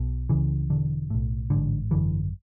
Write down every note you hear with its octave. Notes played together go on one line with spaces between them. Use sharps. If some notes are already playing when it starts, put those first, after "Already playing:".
Already playing: B1 B2
C#2 C#3 E3
E1 E2 D3
B1 A2
A1 G#2 D3
G#1 F#2 D3 E3